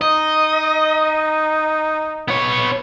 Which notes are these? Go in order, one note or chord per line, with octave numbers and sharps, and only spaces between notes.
D#4 D#5
B3 C#5